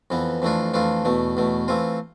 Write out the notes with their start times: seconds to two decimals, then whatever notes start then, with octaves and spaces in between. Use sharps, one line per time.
0.10 F2 E3 B3
0.42 F2 E3 A3 D4 F4
0.74 F2 E3 A3 D4 F4
1.05 E2 B2 A3
1.37 E2 B2 A3
1.68 E3 A3 C4 F4